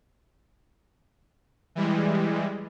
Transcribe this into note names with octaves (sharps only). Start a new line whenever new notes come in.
E3 G3 G#3